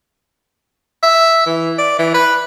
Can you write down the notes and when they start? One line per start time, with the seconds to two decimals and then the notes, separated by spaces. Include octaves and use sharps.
1.03 E5
1.47 E3
1.78 D5
1.99 E3
2.14 B4